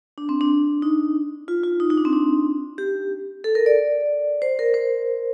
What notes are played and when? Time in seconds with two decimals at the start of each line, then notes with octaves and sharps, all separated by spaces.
0.18 D4
0.29 C4
0.41 D4
0.82 D#4
1.48 F4
1.64 F4
1.80 D#4
1.90 D#4
1.98 D4
2.05 C4
2.13 D4
2.78 G4
3.44 A4
3.55 A#4
3.66 D5
4.42 C5
4.59 A#4
4.74 C5